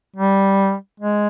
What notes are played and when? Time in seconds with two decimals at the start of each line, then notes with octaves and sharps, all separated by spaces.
0.16 G3
1.00 G#3